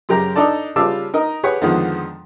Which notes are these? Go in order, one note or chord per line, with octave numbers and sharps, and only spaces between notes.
F#2 C#3 G4 A#4 A#5
D4 D#4 A4 D5 A5
C#3 G3 F4 A5 D6 E6
D#4 A#4 D#5
G4 G#4 B4 C#5 F#5
F2 D3 D#3 F3 G#3 B3